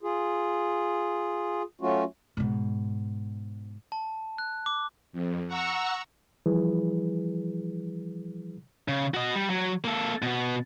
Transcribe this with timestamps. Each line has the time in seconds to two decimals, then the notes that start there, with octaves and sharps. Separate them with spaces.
0.03 F4 G#4
1.81 F#3 A3 C#4 F4 F#4
2.37 G#2 B2
3.92 A5
4.38 F#6
4.66 D6
5.13 F2
5.48 F#5 A#5 C#6 E6
6.46 E3 F3 G3 E4 G#4 B4
8.88 C#3
9.14 F#4 D#5
9.35 G3
9.50 F#3
9.84 A#3 A4
10.22 B2 B3